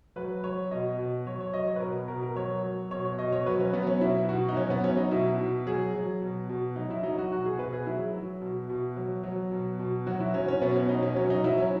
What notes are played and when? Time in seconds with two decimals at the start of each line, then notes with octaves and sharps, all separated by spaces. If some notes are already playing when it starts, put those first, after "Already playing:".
0.16 F#3 B4
0.43 F#3 C#5
0.71 B2 D#5
0.98 B2
1.26 F#3 C#5
1.41 C#5
1.54 F#3 D#5
1.67 C#5
1.76 B4
1.81 B2 A#4
2.08 B2 A#4
2.23 A#4
2.36 F#3 C#5
2.63 F#3
2.91 B2 C#5
3.05 C#5
3.19 B2 D#5
3.32 C#5
3.46 F#3 B4
3.60 C#4
3.73 F#3 B3
3.87 C#4
4.01 B2 E4
4.29 B2 F#4
4.49 D#4
4.56 F#3 C#4
4.70 B3
4.84 F#3 C#4
4.97 D#4
5.11 B2 E4
5.39 B2
5.66 F#3 G#4
5.94 F#3
6.22 B2
6.49 B2
6.76 F#3 D#4
6.91 E4
7.03 F#3 D#4
7.18 F#4
7.31 B2 F#4
7.45 G#4
7.59 B2 B4
7.73 G#4
7.86 F#3 E4
8.14 F#3
8.42 B2
8.69 B2
8.97 F#3
9.24 F#3
9.52 B2
9.79 B2
10.06 F#3 F#4
10.20 E4
10.34 F#3 C#4
10.48 C#4
10.61 B2 B3
10.76 C#4
10.89 B2 D#4
11.03 C#4
11.16 F#3 C#4
11.30 D#4
11.44 F#3 E4
11.58 C#4